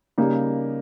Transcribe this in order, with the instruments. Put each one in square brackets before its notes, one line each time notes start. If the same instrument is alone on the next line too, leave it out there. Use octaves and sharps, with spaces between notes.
[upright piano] C#3 G3 A#3 D#4